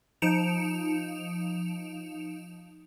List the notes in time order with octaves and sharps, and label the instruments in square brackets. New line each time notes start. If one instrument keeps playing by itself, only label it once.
[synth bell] F3 D#4 C#7 D7 E7 F7